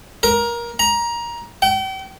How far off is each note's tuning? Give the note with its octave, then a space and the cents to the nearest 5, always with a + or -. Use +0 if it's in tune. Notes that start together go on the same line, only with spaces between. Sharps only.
A#4 +20
A#5 +20
G5 -40